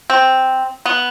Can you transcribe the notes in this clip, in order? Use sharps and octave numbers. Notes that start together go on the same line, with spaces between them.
C4
B3